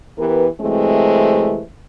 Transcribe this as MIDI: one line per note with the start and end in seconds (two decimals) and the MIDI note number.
0.17 0.46 52
0.17 0.46 59
0.17 0.46 67
0.17 0.46 70
0.17 0.46 71
0.61 1.62 48
0.61 1.62 52
0.61 1.62 54
0.61 1.62 56
0.61 1.62 57
0.61 1.62 60